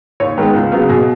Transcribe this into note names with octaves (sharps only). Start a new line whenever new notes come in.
D#2 C#5
D#3 G#3 B3 B4
C#2
C#3 F#3 B3
B2 G#4